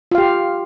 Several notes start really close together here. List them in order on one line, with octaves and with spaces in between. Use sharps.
F4 F5 G4